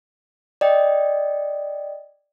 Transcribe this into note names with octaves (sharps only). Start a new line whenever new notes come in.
D5 D#5 G5